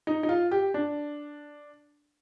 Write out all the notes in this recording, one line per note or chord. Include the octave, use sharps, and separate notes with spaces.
D#4
D#4
F4
G4
D4